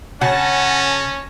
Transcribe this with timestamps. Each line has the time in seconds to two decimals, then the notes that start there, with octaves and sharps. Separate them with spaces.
0.21 C#3 C#4 F#5 A5 A#6